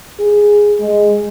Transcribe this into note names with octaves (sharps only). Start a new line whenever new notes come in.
G#4
G#3